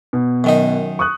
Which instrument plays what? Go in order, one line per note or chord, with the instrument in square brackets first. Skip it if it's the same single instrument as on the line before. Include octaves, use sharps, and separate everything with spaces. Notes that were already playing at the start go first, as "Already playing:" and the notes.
[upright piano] B2
[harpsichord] F#2 D#3 D#4
[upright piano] C#6 D#6 F#6